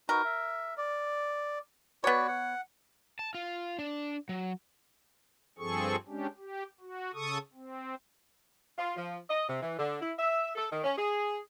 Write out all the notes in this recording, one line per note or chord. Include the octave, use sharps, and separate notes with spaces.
D#4 F#4 A#4 B4
E5
D5
B3 F#4 B4 C#5 D5
F#5
A5
F4
D4
F#3
G2 F3 C4 G#4 A4 C#6
G#3 C#4 D4 G4
G4
F#4
C#3 A4 C#6 D#6
C4
F4
F3
D#5
C3
E3
D3
E4
E5
A4
D#3
C#4
G#4